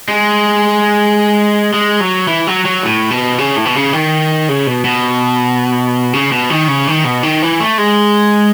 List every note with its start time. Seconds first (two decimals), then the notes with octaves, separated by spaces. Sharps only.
0.08 G#3
1.74 G#3
2.00 F#3
2.28 E3
2.47 F#3
2.65 F#3
2.83 A2
3.11 B2
3.38 C#3
3.57 A2
3.65 B2
3.75 C#3
3.93 D#3
4.49 C#3
4.67 B2
4.84 B2
6.13 C#3
6.32 B2
6.50 D#3
6.68 C#3
6.87 D#3
7.04 B2
7.23 D#3
7.42 E3
7.60 A3
7.78 G#3